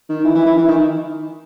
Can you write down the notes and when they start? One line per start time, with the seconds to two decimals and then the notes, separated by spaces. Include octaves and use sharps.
0.09 D#3
0.25 E3
0.35 E3
0.46 E3
0.57 E3
0.68 D#3